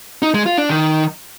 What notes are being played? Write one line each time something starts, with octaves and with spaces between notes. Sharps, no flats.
D#4
G#3
F4
D4
D#3